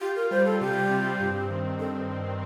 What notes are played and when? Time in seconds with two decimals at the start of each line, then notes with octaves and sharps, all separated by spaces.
0.01 F4 G4
0.16 A#4
0.31 G3 C5
0.46 A4
0.60 C3 G4
0.90 C4
1.20 G2
1.50 D#3
1.79 A4